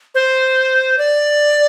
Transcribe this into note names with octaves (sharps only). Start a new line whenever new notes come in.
C5
D5